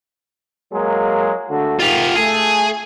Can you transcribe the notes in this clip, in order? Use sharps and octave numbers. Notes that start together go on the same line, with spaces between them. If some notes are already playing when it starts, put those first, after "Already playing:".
F#3 G#3 A#3
D3 A3 F#4
G#2 C3 D#3 F4 G4
A3 G#4